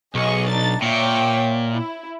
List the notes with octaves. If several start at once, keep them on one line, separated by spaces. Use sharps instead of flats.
B1 G#4 D#5 C#6
D4 D#4 A6
A#2 C#5 E5 G5
E4